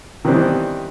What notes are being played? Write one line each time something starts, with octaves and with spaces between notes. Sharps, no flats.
D#3 E3 G3 B3 C4 D4